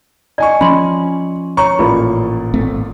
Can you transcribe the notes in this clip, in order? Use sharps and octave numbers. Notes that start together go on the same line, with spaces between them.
D5 D#5 G#5 C#6
F3 C#4 B5 C6
C#5 A#5 C#6
A1 A#2 B5
G#1 A3 C4